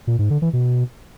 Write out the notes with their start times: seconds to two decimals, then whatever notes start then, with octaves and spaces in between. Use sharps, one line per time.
0.07 A#2
0.19 G#2
0.30 D3
0.42 E3
0.53 B2